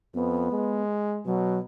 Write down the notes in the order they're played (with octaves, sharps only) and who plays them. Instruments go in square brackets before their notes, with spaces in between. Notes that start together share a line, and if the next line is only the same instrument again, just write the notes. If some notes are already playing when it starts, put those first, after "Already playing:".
[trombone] F2 [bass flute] B3
[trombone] G#3
[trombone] B2 [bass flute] F#3